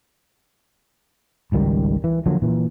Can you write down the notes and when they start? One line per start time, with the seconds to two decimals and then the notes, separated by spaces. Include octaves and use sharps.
1.52 G#1 C#2 D#3 G3
2.04 E3
2.26 D3 F3 F#3 A#3
2.42 A#2 E3